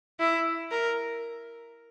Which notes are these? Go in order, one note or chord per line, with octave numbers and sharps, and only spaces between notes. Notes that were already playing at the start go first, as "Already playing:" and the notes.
E4
A#4